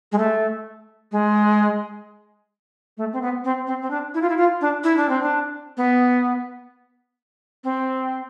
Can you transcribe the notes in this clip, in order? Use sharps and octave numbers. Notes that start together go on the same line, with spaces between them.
G#3
A3
G#3
A3
C4
B3
C4
C4
C4
D4
E4
F4
E4
F4
D4
E4
D4
C4
D4
B3
C4